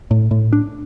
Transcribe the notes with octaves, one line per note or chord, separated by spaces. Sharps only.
A2
A2
D4